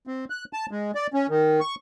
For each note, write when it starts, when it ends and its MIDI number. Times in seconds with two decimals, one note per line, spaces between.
0.07 0.25 60
0.30 0.44 90
0.53 0.66 81
0.71 0.91 56
0.95 1.07 74
1.14 1.27 61
1.29 1.60 51
1.61 1.75 85